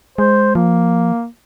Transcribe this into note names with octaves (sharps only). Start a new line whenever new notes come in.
G#3 C5
F3 A#3